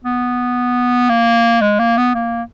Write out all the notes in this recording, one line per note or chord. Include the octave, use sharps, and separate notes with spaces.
B3
A#3
G#3
A#3
B3
A#3